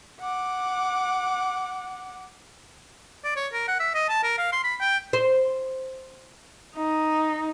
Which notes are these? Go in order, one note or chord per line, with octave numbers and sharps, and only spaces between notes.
F#5 D6
D5
C#5
A#4
F#5
E5
D#5
A5
A#4
F5
C6
B5
G5
C5
D#4